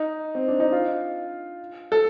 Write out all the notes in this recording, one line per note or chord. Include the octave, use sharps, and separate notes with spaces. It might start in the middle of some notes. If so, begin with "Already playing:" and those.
Already playing: D#4
C4
D4
D#4
F4
A4